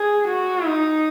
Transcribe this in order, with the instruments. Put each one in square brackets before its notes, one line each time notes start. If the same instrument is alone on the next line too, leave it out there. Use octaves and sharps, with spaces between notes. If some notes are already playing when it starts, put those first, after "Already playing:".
Already playing: [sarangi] G#4
F#4
D#4